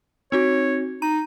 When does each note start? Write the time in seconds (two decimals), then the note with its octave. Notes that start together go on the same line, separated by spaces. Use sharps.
0.32 C4 D#4 F#4 C#5
1.02 D#4 A#5 D#7